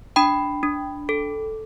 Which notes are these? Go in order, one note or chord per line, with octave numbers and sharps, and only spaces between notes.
D4 G5 B5
D4
A4